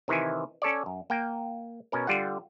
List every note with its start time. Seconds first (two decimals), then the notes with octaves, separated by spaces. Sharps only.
0.08 C3 D#3 E3 E4 G#5
0.62 C#4 A4 C#5 D5
0.86 F#2
1.10 A#3 G5
1.92 B2 C#4 A#4
2.07 D3 G3 F4 F#5